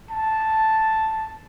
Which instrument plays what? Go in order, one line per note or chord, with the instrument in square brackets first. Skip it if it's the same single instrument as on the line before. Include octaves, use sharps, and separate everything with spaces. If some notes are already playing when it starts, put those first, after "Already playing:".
[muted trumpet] A5